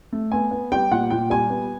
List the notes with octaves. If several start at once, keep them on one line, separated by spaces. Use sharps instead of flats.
A3
B3 G#5
B3
G3 G5
A#2 F#5
A#2 G5
G3 G#5
B3